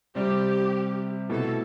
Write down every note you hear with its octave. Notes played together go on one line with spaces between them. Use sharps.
C3 G3 C4 G4
B2 A3 E4 A4